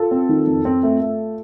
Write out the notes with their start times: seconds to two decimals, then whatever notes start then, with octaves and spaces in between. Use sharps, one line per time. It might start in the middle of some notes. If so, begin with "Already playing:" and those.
Already playing: F4 A4
0.11 C4
0.29 D#3
0.47 F2
0.65 C4
0.83 A3
1.01 A3